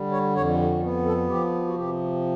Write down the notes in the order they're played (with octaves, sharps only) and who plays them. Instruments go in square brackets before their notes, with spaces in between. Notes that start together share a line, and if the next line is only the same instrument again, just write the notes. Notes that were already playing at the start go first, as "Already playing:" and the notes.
Already playing: [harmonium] D3 G3
C#5
F2 C#5
B3
A4
F3 G4
F#4
C3 G4